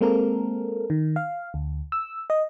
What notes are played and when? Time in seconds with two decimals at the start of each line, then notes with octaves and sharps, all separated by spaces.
0.01 G#3 A#3 C4 A4 A#4
0.90 D#3
1.16 F5
1.54 D2
1.92 E6
2.30 D#5